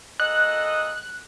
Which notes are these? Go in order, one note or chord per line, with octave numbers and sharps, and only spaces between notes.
A#2 A4 D#5 F#6